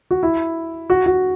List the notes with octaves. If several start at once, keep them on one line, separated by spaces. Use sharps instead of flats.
F#4
E4
F#4
F#4